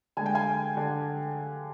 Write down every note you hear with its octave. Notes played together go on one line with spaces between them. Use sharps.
D3 G#3 G#5
G5
F5 G#5
D3